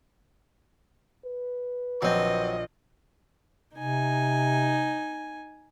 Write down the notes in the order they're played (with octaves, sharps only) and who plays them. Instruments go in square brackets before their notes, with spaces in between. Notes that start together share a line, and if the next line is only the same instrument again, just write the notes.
[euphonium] B4
[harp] A#1 [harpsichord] F#3 C4 [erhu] D#5
[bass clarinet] C3 [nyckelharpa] D#4 G#5